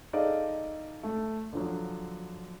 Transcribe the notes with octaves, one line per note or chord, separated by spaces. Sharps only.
D#4 G#4 A4 D5 D#5 F5
A3
D3 F3 F#3